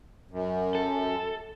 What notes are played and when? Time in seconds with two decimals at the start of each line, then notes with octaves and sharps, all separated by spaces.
0.31 F#2
0.75 A4